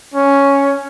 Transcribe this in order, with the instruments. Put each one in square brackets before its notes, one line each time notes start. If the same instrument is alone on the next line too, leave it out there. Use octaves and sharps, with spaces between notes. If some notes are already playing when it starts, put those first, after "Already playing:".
[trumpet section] C#4